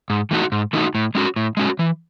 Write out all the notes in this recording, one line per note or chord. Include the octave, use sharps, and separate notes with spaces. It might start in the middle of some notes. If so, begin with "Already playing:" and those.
G#2
E3 A3 D#4 F#4
G#2
E3 A3 D#4 F#4
A2
G#3 C#4 F#4
A2
G#3 C#4 F#4
E3